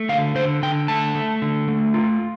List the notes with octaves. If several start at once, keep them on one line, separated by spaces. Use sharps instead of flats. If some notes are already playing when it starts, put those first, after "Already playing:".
Already playing: A3
D3 F5
D3 C5
D3 G5
A3 A5
A3
D3
A3
F4